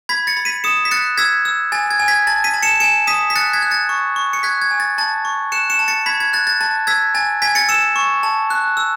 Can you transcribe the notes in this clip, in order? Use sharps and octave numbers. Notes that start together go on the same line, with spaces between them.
B5 G#6 B6
A6 C#7
B5
B6 D#7
D#6 C#7 E7
B6
F#6 A6 C#7
E6 G#6 B6
E6
G#5 A6
G#6
G#5
G#6 B6
A5 A6
B6 D#7
A5
C#7 E7
G#5 C#7 E7
D#6 B6 D#7
B6
F#6 A6 C#7
G#6 B6
F#6
A6 C#7
C#6
C#6
C#7
F#6 G#6 B6
G#6
G#5
A6
A5 A6
C#6
F#6 C#7 E7
C#7 E7
A5
A6 C#7
B5 G#6 B6
G#6
F#6 A6
A6
A5 A6
E6 G#6 B6
G#5 A6
G#5 G#6 B6
A6 C#7
E6 C#7 E7
C#6
A5
F#6
E6